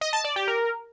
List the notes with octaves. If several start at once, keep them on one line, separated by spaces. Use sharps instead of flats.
D#5
A5
D5
G4
A#4